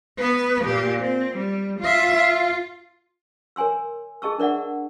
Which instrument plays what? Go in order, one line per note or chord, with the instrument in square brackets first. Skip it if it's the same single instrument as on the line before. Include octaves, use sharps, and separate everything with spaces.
[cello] B3 B4
A#2 G4
C4
G3
F4 E5
F4
[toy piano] A#4 C#5 G#5 C6 E6
G#4 D#5 A5 C#6 E6
D4 A#4 D5 E5 F#5